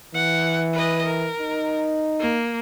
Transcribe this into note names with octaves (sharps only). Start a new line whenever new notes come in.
E3 F#5
B4 D#5
A#4
D#4
A#3